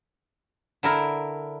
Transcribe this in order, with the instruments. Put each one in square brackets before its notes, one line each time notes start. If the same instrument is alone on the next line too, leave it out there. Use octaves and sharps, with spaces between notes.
[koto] D3 E4 A#4